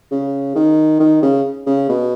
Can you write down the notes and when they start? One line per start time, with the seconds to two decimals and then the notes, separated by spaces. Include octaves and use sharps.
0.11 C#3
0.56 D#3
1.00 D#3
1.22 C#3
1.66 C#3
1.89 B2